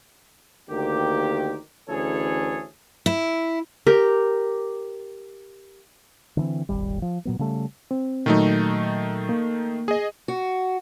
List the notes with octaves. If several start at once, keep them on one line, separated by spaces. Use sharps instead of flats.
D2 D#3 A#3 G4
D2 E3 C#4 G#4 A4 C#5
E4
G4 A#4
D3 E3 C4
D#1 G#1 G3
F3
A#2 F#3 B3
C#3 G3 A3
C4
A#2 D#3 F#3 A3 D#4
A#3
G#4 D#5
F#4